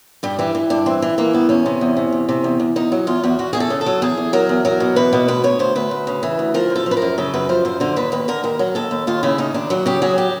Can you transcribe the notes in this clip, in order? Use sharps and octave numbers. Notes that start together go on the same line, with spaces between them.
G2 G3
E3 G3
E3
G2 D4
E3 C4
E3
E3 A#3
G2 B3
E2 C#4
C3
E2
C3
E2
C3
E2
E2
E2 D#4
F#3
E2 F4
E2 F#4
E2 F#4
E2 G#4
A4
C#3
A4
F#3
E2 G#4
E2
F#3 A#4
E2
F#3 A#4
B2
E2 B4
B2
D2 B4
D2 C#5
D2 C5
D2 B4
D2
C#3
E3
D2
F3 A#4
F#2
A4
F3
B4
A#4
F#2
C#3 A4
F#2 B4
F3 C5
F#2 C5
D3 C5
D#2 B4
D#2 B4
D3 A#4
D#2 A#4
F#3
D#2 A4
D#2
D#2 F4
C#3 E4
D#2 D#4
D#2 D4
F#3 F#4
C#3 G4
F#3 G#4
G4